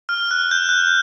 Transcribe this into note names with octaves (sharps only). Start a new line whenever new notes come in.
F6
F#6
G6
F#6
G6